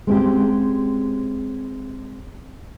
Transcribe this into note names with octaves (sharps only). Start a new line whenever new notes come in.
G#3 C4 C#4 G4